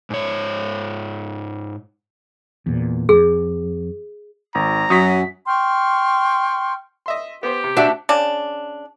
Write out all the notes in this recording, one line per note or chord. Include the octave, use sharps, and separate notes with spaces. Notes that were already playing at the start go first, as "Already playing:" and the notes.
G#2 C#5
E2 A#2
F2 G#4
G#1 A#5
F#2 F#3 D#6 B6
G5 C6 C#6 F6
D#5 E5 C6
B3 G4 C5
C3
D4 F#4 E5 A5
C#3 D4